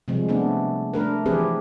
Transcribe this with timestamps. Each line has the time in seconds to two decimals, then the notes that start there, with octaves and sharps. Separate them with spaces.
0.08 C3 F3 G3 G#3
0.29 A3 B3 D4
0.93 A3 D4 A#4 B4
1.26 E3 F3 C4 G4 G#4 B4